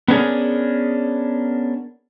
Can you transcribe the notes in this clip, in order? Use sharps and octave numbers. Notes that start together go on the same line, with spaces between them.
B3 C#4 D4 G#4 A#4